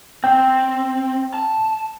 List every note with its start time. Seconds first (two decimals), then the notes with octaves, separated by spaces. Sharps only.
0.24 C4 G5
1.34 A5